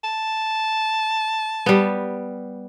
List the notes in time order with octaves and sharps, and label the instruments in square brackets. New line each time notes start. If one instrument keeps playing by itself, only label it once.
[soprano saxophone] A5
[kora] G3 B3